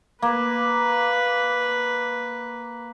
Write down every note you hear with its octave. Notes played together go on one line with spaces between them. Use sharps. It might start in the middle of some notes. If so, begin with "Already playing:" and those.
A#3 B4